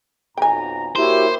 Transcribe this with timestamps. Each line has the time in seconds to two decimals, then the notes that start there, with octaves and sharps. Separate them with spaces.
0.38 B1 F2 G5 G#5 A#5
0.96 A#3 E4 F#4 G4 A#4 C5 C#5